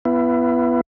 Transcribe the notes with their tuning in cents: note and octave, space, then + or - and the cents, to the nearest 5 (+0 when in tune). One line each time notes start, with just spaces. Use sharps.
B3 +0 E4 +35